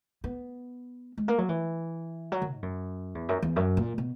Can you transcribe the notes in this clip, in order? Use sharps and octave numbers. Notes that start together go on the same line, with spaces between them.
B3
G#3
A#3
F#3
E3
F#3
D#3
G#2
F#2
E2
F#2
E2
F#2
A#2
B2